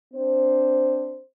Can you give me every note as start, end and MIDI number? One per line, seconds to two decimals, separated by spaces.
0.14 1.21 60
0.14 1.21 62
0.14 1.21 72